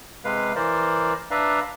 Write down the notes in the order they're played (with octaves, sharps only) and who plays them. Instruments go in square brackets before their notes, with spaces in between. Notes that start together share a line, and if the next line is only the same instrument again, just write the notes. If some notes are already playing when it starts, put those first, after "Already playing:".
[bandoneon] C3 G#3 B4 F5
E3 A#4 C5 D5
D4 B4 D5 E5 F5 A#5